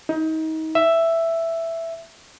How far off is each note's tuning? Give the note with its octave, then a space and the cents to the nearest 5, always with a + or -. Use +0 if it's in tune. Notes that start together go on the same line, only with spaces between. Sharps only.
D#4 +30
E5 +5